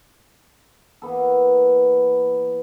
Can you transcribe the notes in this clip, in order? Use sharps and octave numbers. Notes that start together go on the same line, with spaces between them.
E3 A#3 B3 A4